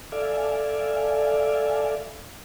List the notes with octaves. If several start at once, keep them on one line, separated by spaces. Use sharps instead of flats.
A4 D5 E5 F5 G#5